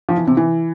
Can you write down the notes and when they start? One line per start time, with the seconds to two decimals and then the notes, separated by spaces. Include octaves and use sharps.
0.09 F3
0.17 E3
0.27 C3
0.37 E3